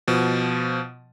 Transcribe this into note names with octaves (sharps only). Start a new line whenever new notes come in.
B2 F3